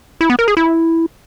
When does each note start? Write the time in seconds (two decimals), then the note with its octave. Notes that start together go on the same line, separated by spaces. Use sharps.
0.21 E4
0.30 B3
0.39 A#4
0.48 G#4
0.57 E4